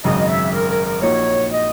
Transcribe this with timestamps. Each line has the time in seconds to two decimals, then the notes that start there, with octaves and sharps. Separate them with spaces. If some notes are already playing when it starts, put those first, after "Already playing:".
0.04 G#1 F#2 C#3 D#5
0.28 E5
0.53 A#4
0.69 A#4
0.86 A#4
1.02 A#1 A#2 A#3 D#4 F#4 C#5
1.51 D#5